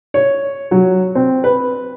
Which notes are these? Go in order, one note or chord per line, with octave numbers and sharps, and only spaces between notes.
C#5
F#3
C4
B4